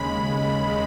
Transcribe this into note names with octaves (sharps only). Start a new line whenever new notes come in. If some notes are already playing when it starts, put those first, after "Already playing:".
Already playing: D#2 C#3 G#3 B5
C#3 G#3